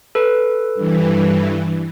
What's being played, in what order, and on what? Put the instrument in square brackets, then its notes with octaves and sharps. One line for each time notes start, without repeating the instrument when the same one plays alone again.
[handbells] A4 B4
[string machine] G2 E3